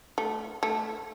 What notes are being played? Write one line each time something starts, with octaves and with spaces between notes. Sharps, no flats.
A3
A3